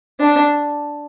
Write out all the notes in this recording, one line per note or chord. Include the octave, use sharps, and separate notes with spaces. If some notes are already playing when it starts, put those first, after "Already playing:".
D4